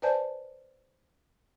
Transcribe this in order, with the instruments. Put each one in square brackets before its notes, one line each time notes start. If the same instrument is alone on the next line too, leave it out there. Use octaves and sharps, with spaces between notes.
[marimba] B4 C5 D5 G#5 A5 G6